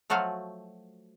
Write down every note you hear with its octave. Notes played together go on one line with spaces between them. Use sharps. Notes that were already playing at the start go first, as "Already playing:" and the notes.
F3 F#3 A3 F#4 F5